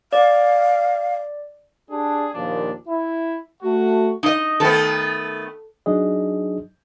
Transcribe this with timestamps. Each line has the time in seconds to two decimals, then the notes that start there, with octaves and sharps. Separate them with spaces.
0.13 D5 F5
1.89 D4 G4 G#4
2.34 D#2 A#2 F3 D4
2.87 E4
3.62 A3 F#4
4.23 D#4 D#5
4.60 D#3 A3 B3 A4
5.86 F#3 D4 D#4 G#4 D#5